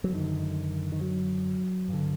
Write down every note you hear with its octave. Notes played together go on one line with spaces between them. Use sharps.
F#3
F#2 D3 D#3
D#3
F#3
G2 D3